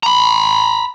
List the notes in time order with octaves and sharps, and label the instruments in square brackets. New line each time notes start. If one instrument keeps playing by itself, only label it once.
[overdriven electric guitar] A#5 B5